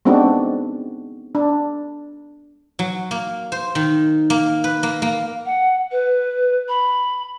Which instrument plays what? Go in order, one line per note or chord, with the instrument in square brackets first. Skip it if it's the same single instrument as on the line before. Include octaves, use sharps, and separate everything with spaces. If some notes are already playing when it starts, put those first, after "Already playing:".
[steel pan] G#3 B3 C4 D4 D#4 F#4
D4
[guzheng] F#3
A#3
C5
D#3
A#3
B4
A#3
A#3
[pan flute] F#5
B4
B5